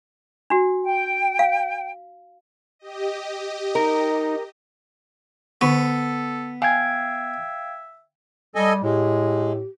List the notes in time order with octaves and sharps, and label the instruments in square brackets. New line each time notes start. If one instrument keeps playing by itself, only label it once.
[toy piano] D4 F#4
[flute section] G5
[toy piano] F5
[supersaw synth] G4 D#5
[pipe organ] D#4 [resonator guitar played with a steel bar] A#4
[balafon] D3 C#6 [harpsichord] B3 [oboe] A4
[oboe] E5 [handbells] F5 G5 G#6 [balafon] G#5
[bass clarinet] G3 [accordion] A4 D#5 G#5
[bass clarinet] A2 [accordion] G#3 [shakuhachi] G4